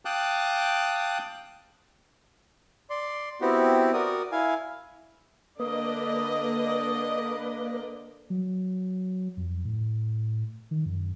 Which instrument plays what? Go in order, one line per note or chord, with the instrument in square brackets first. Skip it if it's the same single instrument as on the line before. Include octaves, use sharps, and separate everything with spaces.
[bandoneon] F5 G5 A5 D6 D#6 F#6
[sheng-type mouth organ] D5 C6
B3 C4 E4 F#4 G4
F#4 A#4 D5 D#6
E4 F5 G#5
[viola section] D3 D5 D#5 [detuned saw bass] A#3 [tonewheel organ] B4 [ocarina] D#6
[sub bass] F#3
F2
A2
D#3
F#2